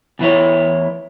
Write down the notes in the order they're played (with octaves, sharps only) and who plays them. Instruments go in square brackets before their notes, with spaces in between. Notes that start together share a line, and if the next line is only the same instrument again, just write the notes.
[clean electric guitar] E2 E3 E4 C#5